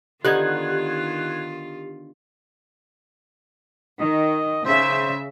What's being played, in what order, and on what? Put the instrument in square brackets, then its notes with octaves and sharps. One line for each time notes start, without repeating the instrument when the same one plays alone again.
[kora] D3 B3 D#4 [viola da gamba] D#3 F4 [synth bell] G4 [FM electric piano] F#6 G#6
[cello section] D#3 [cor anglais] D#5
[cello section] C#3 E5 [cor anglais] C5